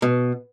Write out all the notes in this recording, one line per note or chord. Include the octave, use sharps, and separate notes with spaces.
B2